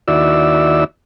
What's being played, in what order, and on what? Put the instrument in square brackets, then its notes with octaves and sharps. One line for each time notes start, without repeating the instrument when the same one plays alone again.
[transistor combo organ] D#2 E4 F#4 D5 E6